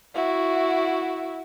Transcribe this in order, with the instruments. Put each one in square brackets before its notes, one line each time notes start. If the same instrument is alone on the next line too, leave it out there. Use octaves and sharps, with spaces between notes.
[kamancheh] E4 F#4